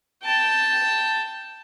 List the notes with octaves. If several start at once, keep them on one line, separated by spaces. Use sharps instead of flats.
G5 A5